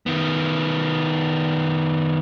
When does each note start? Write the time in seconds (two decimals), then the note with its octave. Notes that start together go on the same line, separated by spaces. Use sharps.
0.06 D#3 B3